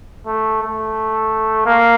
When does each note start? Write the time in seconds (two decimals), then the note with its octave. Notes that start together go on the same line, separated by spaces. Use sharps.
0.27 A3
0.62 A3
1.66 A#3